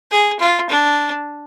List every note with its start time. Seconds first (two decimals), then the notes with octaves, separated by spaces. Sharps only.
0.11 G#4
0.40 F4
0.70 D4